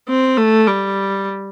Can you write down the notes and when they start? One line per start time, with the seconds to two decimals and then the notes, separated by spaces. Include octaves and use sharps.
0.09 C4
0.37 A3
0.67 G3